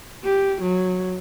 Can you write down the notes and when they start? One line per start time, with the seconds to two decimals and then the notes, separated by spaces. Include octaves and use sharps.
0.24 G4
0.62 F#3